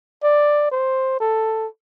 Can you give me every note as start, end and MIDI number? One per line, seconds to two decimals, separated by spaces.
0.23 0.70 74
0.71 1.19 72
1.20 1.67 69